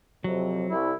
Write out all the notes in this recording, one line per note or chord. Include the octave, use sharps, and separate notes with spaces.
F2 C3 F#3
C2 E4